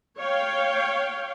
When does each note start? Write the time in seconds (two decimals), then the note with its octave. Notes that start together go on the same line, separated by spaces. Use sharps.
0.19 C#5 F5 G5